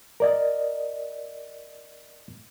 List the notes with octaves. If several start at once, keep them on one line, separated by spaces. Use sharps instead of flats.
A#4 D5 D#5